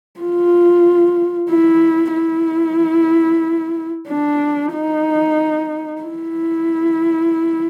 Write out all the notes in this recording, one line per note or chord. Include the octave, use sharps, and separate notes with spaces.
F4
E4
E4
D4
D#4
E4